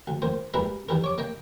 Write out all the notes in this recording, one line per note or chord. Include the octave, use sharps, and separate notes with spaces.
D2
D#3 A#3 C5
G3 G#3 A#3 E4 A#4 B4
D#3 E3 G3 A#4
C#5 D6
A#3 D#5 G5